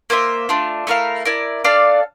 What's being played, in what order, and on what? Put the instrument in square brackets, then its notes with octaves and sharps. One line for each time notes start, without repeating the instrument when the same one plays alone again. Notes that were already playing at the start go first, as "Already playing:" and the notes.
[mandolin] A#3 F4 C5 E5
A3 D4 F4
A3 E4 A#4 F5
E4 A#4 D5
D4 A4 D5 F5